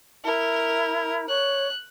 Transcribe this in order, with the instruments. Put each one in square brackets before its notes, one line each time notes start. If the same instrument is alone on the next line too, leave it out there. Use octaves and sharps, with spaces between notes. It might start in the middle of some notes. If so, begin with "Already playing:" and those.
[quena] E4 [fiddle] A#4
[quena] C#5 [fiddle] F#6